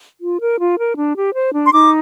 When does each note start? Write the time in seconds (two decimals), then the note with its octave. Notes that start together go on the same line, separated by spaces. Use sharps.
0.22 F4
0.40 A#4
0.59 F4
0.78 A#4
0.97 D4
1.15 G4
1.35 C5
1.53 D4
1.65 C6
1.72 D#4 D6